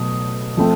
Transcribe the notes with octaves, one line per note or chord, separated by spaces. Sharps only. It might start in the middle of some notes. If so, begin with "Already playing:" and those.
Already playing: B2 F#3 A3 D#6
F3 A3 C4